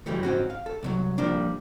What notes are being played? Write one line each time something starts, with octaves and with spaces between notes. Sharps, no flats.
F#2 E3 F#3 G3 A3
G#2 C4 C#4 F#4
F5
A4
C2 A2 F#3
F3 G3 A#3 D4